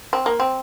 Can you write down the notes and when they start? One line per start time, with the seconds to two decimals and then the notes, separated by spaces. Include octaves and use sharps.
0.13 C4
0.26 A#3
0.40 C4